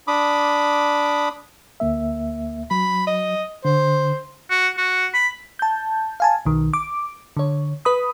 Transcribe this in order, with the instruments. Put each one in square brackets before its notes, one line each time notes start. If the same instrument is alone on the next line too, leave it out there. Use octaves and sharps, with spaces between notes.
[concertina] D4 B5 D6 D#6
[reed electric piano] D2 A#3 E5
[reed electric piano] F#3 [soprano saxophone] B5
[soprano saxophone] D#5
[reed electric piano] D3 [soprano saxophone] C5
[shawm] F#4
F#4
B5
[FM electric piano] A5 G6
F5 G#5 A5
B1 D#3
D6
D3 C#5
B4 B5 D#6